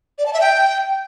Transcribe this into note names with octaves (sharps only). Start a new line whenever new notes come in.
D5
A5
E5
G5